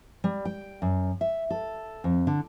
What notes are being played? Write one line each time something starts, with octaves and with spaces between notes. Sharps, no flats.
G3
G5
F#2
E5
A4
F2
D3